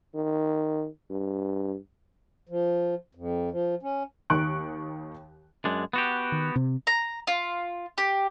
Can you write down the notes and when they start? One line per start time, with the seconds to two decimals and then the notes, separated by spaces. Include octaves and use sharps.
0.14 D#3
1.10 G2
2.49 F3
3.15 F2
3.51 F3
3.83 C#4
4.30 D#2 D#3 C#6 F#6 D7
5.65 F#2 G#3 D4
5.93 B3 F#4 G4
6.32 D#3
6.56 C3
6.87 A#5
7.27 F4
7.98 G4